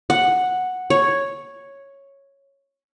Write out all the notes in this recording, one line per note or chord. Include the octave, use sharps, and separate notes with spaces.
F#5
C#5